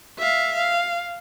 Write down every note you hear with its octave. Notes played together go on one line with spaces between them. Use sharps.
E5 F5
F5